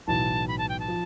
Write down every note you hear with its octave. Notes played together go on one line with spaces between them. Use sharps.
B1 A2 E3 A5
B5
A5
G5
A5
F3